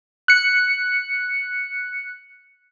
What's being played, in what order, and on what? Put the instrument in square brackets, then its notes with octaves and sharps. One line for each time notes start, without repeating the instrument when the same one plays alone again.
[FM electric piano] F#6 C#7